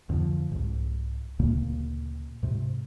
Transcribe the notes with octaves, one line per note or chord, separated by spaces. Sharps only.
F2 D3 D#3 F3
C2 G#2
D2 A#2 C#3 A#3
G#2 C3